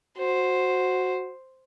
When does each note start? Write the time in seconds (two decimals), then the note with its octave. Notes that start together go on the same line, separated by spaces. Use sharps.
0.18 F#4 C5